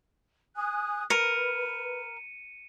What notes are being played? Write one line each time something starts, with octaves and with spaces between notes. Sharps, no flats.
G#5 D#6 F#6
A#4 B4 C#7 D#7